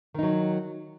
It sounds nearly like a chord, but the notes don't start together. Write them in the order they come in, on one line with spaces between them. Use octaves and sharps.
D#3 D#4 F#3